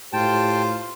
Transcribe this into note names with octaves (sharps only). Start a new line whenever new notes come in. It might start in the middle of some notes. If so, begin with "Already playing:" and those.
A2 F4 G4 C5 G5 A5